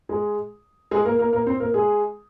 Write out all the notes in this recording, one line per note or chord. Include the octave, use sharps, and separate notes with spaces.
G#3 G#4
G#3 G#4
A#3 A#4
A#3 A#4
A#3 A#4
C4 C5
A#3 A#4
G#3 G#4